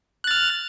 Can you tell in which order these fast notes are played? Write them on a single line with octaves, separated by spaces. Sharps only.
F#6 A6 F6